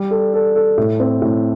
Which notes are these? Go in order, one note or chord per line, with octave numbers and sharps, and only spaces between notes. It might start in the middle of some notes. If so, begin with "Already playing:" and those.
Already playing: G3
A4
A4
A4
A2
C4
A2